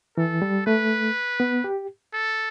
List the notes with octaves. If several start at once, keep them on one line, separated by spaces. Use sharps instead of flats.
E3 A4
G3
A3 B4
B3
G4
A4